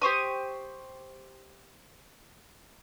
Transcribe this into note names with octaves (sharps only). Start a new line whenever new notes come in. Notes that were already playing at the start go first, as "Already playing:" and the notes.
G4 C5 C#6 D#6